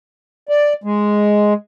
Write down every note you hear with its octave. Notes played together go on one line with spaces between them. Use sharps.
D5
G#3